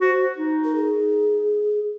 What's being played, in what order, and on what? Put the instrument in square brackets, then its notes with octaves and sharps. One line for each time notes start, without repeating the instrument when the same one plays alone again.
[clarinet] F#4 [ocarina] C5
[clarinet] D#4
[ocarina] A#4
G#4